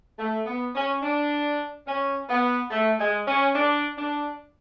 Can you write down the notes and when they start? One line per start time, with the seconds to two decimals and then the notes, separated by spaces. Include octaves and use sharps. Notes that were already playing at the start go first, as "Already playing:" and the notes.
0.17 A3
0.45 B3
0.74 C#4
1.02 D4
1.86 C#4
2.29 B3
2.71 A3
2.99 G#3
3.26 C#4
3.54 D4
3.97 D4